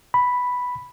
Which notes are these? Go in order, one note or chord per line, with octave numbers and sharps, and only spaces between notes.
B5